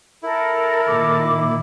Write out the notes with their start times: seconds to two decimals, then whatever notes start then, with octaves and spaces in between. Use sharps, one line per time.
0.23 E4 A4 A#4
0.88 A#2 D#3 D6